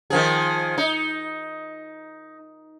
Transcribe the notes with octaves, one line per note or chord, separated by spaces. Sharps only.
D#3 F3 G#4
D#4